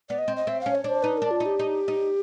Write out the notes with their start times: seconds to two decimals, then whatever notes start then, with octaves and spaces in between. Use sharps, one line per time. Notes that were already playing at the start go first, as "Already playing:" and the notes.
0.09 B3 D5
0.18 D#5
0.28 C4
0.36 D#5
0.47 C4 E5
0.61 C#4 F5
0.75 C#5
0.84 D4 C5
1.03 D#4 B4
1.17 D4 A#4
1.31 F4
1.40 D#4
1.46 G4
1.59 D#4
1.88 D#4